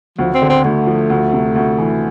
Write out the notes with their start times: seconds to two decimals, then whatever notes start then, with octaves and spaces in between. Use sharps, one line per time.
0.18 D2 F3
0.34 C4
0.42 D3
0.50 C4
0.64 D2 A3
0.87 F3
1.10 D2
1.33 C3
1.56 D2
1.79 E3